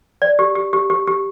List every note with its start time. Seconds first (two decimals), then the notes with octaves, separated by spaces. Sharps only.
0.22 D5
0.39 G4
0.55 G4
0.73 G4
0.90 G4
1.07 G4